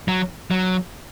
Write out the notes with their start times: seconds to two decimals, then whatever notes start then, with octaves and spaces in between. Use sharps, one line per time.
0.08 F#3
0.51 F#3